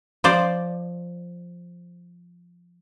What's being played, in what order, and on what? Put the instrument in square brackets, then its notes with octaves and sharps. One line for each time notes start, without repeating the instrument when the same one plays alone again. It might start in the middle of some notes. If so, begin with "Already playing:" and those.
[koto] F3 C5 D5